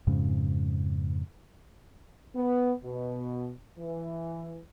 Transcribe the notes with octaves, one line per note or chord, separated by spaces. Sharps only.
F2 G#2 C#3
B3
B2
E3